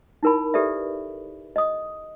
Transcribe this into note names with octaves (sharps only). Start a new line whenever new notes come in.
D#4 E4 A#4 G#5 B5
G4 A4 B4 D5 E5
D#5 D#6